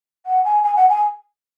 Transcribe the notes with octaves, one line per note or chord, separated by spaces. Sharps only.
F#5
G#5
G#5
F#5
G#5